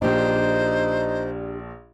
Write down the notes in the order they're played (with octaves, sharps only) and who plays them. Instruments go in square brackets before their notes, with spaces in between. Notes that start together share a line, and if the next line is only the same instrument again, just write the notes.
[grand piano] A#1 A#2 [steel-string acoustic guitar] D4 G4 [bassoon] D#4 [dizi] C5